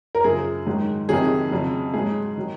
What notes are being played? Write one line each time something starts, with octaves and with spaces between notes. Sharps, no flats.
A#4
F#2 C#3 F3 G#4
G#2 D#3 F#3
F2 C3 D#3 F#3 G#4
F2 C#3 F#3
G#2 F#3 G#4
D#3 F#3